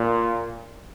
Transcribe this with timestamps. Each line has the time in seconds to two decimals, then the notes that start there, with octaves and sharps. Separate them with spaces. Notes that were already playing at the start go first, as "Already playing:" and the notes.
Already playing: A#2